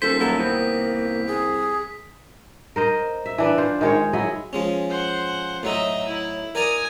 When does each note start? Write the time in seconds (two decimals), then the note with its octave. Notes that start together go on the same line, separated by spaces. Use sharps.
0.02 D#1 A4 C5 B6
0.20 F#3 A#3 E4 A4
0.38 C2 D#3 B3 C4
1.27 G#4
2.76 A#4 C5 D#5
3.26 E5
3.38 E3 D4 B4
3.58 F4 C5
3.81 D#3 G#3 C#5
4.13 F#3 E4 G#4 D#5
4.53 F3 G#3 C#4
4.90 C5 F#5
5.63 A2 F#3 D#4 D#5 E5
6.08 E4
6.55 A#4 D5 G#5 A#5 D#6